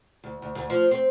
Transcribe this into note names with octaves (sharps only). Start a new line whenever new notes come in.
D2
D2
D2
F3
C4